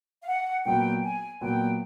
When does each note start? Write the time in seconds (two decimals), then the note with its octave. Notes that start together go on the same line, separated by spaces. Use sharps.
0.22 F5
0.28 F#5
0.66 A#2 F#3 B3 G5
1.03 G#5
1.41 A#2 F#3 B3 G5